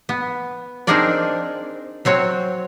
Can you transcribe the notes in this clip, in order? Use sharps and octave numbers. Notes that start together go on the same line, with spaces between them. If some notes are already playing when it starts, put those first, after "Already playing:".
B3
C4 D4 D#4 G#4 A#4 D5
F#3 C4 F#4 C#5